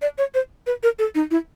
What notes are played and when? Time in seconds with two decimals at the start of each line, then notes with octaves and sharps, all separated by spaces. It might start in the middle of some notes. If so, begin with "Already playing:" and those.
0.02 D5
0.18 C#5
0.34 C5
0.67 B4
0.83 A#4
0.99 A4
1.15 D#4
1.31 E4